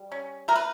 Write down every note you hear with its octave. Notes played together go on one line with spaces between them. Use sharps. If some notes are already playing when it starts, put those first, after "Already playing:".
Already playing: G3
C#4
A3 A#4
B4